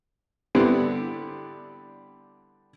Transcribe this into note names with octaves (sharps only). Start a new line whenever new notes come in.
D3 G3 B3 C4 D4 E4